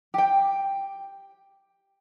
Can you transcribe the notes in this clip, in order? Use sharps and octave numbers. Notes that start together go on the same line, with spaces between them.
G4 G5